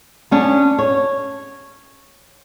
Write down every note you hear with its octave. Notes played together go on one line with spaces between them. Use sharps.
B3 C#4 D4
C#5